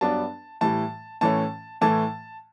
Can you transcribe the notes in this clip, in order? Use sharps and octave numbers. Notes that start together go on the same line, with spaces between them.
G2 F#3 B3 D4 A5
A2 E3 G3 A5
A2 E3 A3 C#4 A5
A2 E3 A3 A5